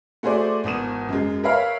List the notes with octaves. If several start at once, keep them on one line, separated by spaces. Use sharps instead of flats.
A3 F#4 G#4 C5 D5
G#1 E2 D#6 E7
F#2 G#3
A#4 B4 C#5 E5 F5 B5